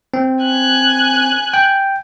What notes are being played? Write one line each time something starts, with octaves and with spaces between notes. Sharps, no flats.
C4
G#5 F#6
G5